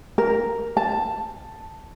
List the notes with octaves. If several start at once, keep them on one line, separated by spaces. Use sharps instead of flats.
A#4
A5